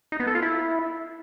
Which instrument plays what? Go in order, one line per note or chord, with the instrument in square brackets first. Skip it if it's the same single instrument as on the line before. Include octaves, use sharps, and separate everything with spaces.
[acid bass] D#4
B3
A4
F4
E4